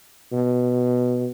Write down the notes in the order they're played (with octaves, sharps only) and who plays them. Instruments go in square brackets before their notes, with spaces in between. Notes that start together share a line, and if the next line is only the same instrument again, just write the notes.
[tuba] B2